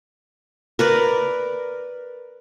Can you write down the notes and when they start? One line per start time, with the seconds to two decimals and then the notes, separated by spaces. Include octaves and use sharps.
0.79 A#4 B4 D5